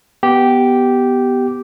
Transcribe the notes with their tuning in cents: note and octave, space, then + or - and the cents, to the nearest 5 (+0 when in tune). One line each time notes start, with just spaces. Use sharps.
B3 +0 G4 -10